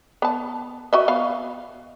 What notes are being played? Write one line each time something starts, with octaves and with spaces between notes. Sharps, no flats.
B3 A5
F#4 D#5 E5
B3 F5